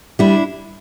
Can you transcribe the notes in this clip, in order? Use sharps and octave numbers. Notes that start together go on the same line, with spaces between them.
G3 D4 E4